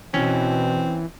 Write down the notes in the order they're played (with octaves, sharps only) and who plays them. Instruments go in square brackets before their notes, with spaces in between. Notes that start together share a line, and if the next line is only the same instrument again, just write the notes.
[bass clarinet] B2 [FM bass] E3 [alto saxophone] C4 [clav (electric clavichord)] C#4